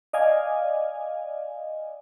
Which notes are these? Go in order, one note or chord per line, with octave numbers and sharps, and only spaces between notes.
D5 D#5 F5 G#5